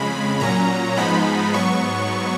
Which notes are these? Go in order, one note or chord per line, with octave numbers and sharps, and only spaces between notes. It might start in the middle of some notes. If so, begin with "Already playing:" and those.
Already playing: F2 C#3 G#3 B5
A#2 F#3 C#4 A#5
G#2 F3 G#3 B3 D#4 B5
G#2 F#3 B3 C#6